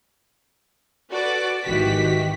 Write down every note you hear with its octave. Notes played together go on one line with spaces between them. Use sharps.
F#4 A4 B4 D5 F#5 D6
G#1 D#3 E3 F#4 G4 B6